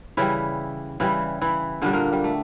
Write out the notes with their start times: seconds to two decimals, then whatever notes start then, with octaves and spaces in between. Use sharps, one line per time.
0.17 C#3 E3 G3 E4
1.00 C#3 E3 G3 E4
1.41 E3 E4
1.82 A#2 D3 G3 D4
1.93 A#2 A#3
2.13 G3
2.24 A3